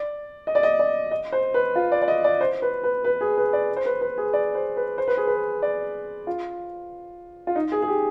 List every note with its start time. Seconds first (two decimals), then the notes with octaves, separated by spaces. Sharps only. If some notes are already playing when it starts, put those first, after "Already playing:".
Already playing: D5
0.47 D#5
0.55 D5
0.63 D#5
0.79 D5
1.11 D#5
1.32 C5
1.54 B4
1.76 F4
1.92 D5
2.02 D5
2.08 D#5
2.24 D5
2.41 C5
2.62 B4
2.84 B4
3.04 B4
3.21 G#4
3.37 B4
3.53 D5
3.76 C5
3.85 B4
4.01 B4
4.18 G#4
4.33 D5
4.55 C5
4.77 B4
4.98 C5
5.08 B4
5.17 G#4
5.27 B4
5.62 D5
6.27 F4
7.47 F4
7.56 D#4
7.72 G#4
7.82 G#4
7.88 G4